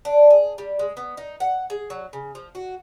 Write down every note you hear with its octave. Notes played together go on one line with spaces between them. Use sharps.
D4
G#4
G3
G#3
B3
D#4
F#5
G#4
F#3
C#3
F3
F#4